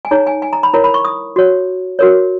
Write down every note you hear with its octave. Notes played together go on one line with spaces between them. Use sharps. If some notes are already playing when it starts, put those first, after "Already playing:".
G#5
D#4 G#4 C#5 A#5
G#5
G#5
A#5
B5
E4 A#4 C#5 A#5
B5
C#6
D#6
F#4 C#5
F#4 A#4 C#5